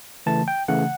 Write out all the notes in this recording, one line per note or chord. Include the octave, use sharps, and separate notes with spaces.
C#3 E3 A3 A5
G5
C#3 E3 A3 F#5